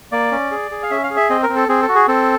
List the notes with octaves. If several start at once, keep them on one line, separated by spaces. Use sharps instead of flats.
A#3 D5
C#4
G#4
G#4
F5
C#4 E5
F5
G#4
E5
C4 D#5
A#4
C4
A4
C4 G#4
A4
F#4
G#4
C4 A4